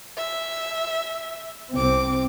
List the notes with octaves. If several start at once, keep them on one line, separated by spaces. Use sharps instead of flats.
E5
C2 C4 D6